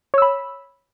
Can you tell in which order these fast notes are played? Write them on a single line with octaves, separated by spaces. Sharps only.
C#5 E6 B5